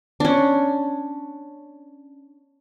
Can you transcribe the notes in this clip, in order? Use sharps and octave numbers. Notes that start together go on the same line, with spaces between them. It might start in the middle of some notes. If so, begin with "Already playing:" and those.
C#4 D4